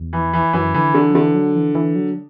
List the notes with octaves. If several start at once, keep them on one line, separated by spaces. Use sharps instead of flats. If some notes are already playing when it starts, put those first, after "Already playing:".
Already playing: E2
E3
E3
F#2 E3
D3 E3
D3 E3
F#3
D3 E3
F#3
E3
E3
F#3